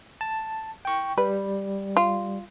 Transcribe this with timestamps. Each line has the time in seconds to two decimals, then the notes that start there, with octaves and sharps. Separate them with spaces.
0.21 A5
0.85 G5 C#6
1.18 G3 B4
1.97 F4